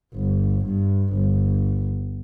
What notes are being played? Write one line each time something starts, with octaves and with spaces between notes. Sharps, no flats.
G1
G2
G1